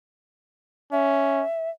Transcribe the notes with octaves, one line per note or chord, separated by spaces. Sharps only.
C#4 E5